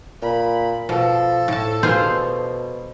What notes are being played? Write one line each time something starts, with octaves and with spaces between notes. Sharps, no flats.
A#2 B5
B2 F3 A4
A2 A5
B2 F4 G#4 C5